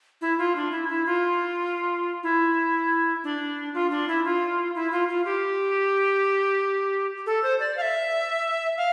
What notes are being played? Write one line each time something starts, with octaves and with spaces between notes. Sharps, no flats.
E4
F4
D4
E4
E4
F4
E4
D4
F4
D4
E4
F4
E4
F4
F4
G4
A4
C5
D5
F5
E5
F5